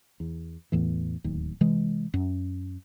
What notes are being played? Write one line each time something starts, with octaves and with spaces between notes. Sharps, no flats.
E2
E2 A2 E3
D1 D#2
C3 E3 G#3
F#2